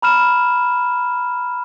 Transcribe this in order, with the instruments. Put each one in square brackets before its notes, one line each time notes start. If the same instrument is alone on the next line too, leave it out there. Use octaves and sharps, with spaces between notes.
[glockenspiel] A#5 B5 F6 E7